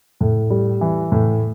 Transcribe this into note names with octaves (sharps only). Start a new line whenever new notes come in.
A2
G3
E3
A2